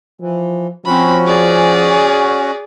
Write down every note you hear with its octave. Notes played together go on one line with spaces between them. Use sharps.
E3 F3
F3 C4 C#4 F#4 B5
G#4 D5